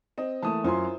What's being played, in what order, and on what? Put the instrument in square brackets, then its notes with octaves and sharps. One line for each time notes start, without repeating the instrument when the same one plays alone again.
[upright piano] C4 D#5
[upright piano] E3 A3 A#3 [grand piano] A5 D#6
[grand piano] F#2 G#5 C6 [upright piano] E4 F4 C5